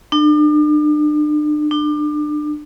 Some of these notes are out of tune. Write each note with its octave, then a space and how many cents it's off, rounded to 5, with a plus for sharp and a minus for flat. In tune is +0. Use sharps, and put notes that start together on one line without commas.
D4 +40
D4 +30